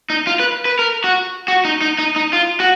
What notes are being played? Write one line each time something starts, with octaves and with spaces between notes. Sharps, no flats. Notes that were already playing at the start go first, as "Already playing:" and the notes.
D#4
F4
B4
B4
A#4
F#4
F#4
D#4
D#4
D#4
D#4
F4
F#4